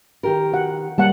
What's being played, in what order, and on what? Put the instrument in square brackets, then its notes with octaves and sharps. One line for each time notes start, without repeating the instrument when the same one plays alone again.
[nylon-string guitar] D#3 G4 A#4
[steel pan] F#4 F#5
[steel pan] G3 A#3 F#5 [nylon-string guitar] A5